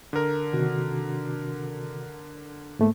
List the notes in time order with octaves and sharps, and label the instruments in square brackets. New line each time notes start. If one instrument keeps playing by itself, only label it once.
[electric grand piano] D3 A#4
[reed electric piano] C3 D#3 F#4
G#2 A3 A#3